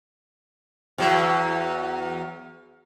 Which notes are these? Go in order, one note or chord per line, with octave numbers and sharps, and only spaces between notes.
E2 F#3